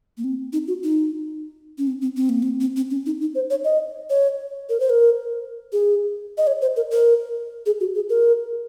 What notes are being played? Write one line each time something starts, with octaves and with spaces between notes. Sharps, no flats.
A#3
C4
D#4
F#4
D#4
C#4
C4
C4
C4
A#3
C4
C4
C4
C#4
D#4
D#4
C5
C#5
D#5
C#5
A#4
C5
A#4
G#4
D#5
C#5
C5
A#4
A#4
G#4
F#4
G#4
A#4